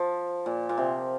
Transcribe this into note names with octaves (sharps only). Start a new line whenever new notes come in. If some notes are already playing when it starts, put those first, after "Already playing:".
Already playing: F3
A#2
A#2
C3